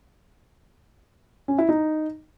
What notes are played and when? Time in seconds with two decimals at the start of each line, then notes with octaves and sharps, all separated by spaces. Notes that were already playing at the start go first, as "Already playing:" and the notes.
1.48 C#4
1.58 E4
1.69 D#4